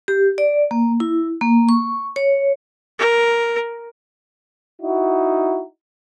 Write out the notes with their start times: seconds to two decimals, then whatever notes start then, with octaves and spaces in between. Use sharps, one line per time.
0.08 G4
0.38 D5
0.71 A#3
1.00 E4
1.41 A#3
1.69 C#6
2.16 C#5
2.99 A#4
4.81 D#4 E4 F#4